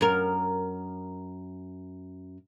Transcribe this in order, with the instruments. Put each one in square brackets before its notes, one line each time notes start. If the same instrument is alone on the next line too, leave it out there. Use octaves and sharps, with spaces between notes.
[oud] F#2 A#4